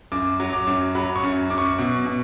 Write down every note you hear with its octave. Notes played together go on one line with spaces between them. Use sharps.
F#2 D6
F#3
D6
F#2
F#3 B5
C#6
F#2
F#2 D6
C#6
B2
B2